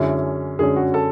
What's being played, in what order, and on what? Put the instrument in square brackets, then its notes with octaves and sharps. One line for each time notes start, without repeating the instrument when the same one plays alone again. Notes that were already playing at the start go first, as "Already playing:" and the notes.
Already playing: [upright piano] F#2 D3 G#3 C#4 [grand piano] E4
[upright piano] F#2 D3 G#3 C#4 [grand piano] G#4
[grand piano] F#4
A4